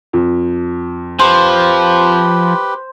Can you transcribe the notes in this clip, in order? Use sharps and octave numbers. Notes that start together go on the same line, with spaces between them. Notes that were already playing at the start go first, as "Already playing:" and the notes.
F2
F3 G4 B4 C5